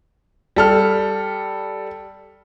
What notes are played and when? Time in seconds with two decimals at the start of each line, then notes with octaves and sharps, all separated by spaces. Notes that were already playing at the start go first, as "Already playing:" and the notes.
0.56 G3 A4 F6